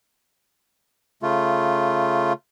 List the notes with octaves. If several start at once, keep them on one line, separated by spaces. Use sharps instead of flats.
C#3 A3 F4